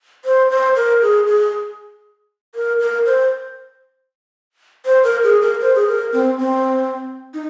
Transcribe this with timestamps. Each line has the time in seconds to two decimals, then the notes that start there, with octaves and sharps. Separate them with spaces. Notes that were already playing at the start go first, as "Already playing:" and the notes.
0.25 C5
0.50 C5
0.76 A#4
1.02 G#4
1.27 G#4
2.55 A#4
2.80 A#4
3.06 C5
4.85 C5
5.04 A#4
5.23 G#4
5.42 A#4
5.61 C5
5.75 G#4
5.87 A#4
6.13 C4
6.38 C4
7.34 D#4